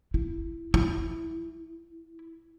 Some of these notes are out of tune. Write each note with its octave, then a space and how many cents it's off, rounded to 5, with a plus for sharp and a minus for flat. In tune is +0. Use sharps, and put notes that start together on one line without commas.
E4 +10
E4 +0